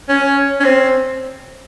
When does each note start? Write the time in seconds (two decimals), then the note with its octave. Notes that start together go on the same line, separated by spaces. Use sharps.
0.09 C#4
0.60 C#4
0.64 C4